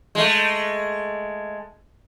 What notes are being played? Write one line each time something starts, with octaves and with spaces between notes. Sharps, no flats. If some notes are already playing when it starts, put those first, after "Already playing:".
G#3 A3